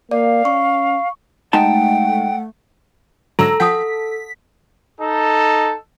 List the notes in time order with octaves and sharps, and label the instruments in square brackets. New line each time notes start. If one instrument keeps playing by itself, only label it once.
[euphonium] A#3 [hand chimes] D5 [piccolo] F5
[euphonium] C#4 [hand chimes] C#6
[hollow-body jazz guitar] G#3 D#4 A5 [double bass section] A3 [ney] F#5 [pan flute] G5
[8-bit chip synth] G#2 D3 F#3 [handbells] A4 [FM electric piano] A#5 E6
[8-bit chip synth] F3 G5 [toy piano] F#5 A5 D#6 [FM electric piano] B6
[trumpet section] D#4 A4